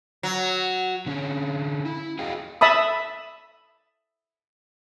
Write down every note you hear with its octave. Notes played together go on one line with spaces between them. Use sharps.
F#3
D3 C#4
E4
F#4 G#4 D#5 F5 G5
E5 A5 B5 D#6